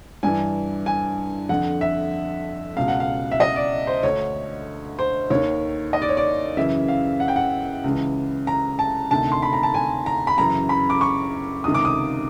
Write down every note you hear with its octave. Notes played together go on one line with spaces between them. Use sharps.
G2 E3 G#5
G#5
F2 D3 F#5
E5
C#2 B2 F5
F#5
F5
E5
D#5
D5
C5
D2 D3 C#5
C5
D#2 D#3 C#5
D#5
D5
C#5
D5
F#2 C#3 E3 E5
F5
F#5
G5
F#5
C#2 C#3 E3
A#5
A5
D2 C3 D#3 A5
C6
B5
A#5
A5
G#5
A#5
B5
F#2 C#3 E3 A#5
B5
D6
C#6
C#2 C3 D#3 D#6
D6
D#6